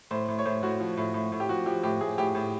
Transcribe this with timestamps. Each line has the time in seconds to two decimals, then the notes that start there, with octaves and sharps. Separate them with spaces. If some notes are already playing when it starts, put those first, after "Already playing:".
0.11 A2 C5
0.28 A2
0.38 C#5
0.45 A2 C5
0.63 A2 F#4
0.80 F3
0.97 A2
1.14 A2
1.32 A2
1.40 G4
1.49 F3 F#4
1.66 F3 G4
1.83 A2 G4
2.01 A2 G#4
2.18 A2 G4
2.35 A2